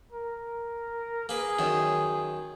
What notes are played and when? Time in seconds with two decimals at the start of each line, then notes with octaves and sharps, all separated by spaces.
0.12 A#4
1.29 A#3 G#4 B4
1.59 F#2 D#3